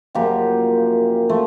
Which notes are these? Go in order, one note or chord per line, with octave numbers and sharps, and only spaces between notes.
F#2 C#3 F3 A#3 G4
F3 A3